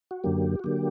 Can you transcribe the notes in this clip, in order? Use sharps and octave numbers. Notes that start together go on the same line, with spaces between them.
F#4
F#2 D3 F#3 A#3 G4
F#4
D3 F#3 A#3 G4